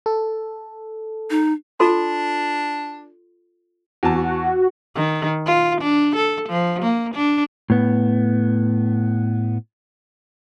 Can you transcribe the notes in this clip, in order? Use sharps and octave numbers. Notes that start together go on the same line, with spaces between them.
A4
D#4
D4 F4 A4 C6
E2 F#4 A5
D#3
F4
D4
A4
F3
A#3
D4
A2 B3